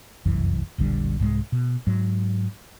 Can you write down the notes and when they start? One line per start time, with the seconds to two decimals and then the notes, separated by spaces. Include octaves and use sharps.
0.25 F1 C2 F#2 E3
0.78 E1 A#1 D3 G3
1.19 C2 G#2 G3 G#3
1.52 B2
1.87 G#2 F#3